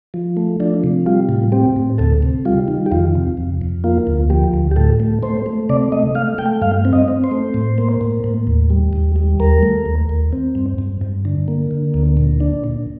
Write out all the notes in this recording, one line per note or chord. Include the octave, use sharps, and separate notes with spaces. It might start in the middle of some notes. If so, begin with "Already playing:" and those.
F3
A3
F3 D4
C3
G3 F4
A2
C4 G4
A2
D2 A4
C3
G3 F4
D#3
G4
F2 F4
C3
F2
F2
A#3 F4
D2
F3 G4
D2
G4
A2 A4
A3
A3 C5
A3
C3 D5
A3 D#5
A3 F5
A3 G5
G2 F5
C4
D#5
C4
C5
A3
A2
A#3
A2
A2
D#2
G3
D#2
G3
D#2 A#4
A3
D#2
D#2
C4
G2
G2
G2
D3
A#3
D3
D2
A#2
D4
A#2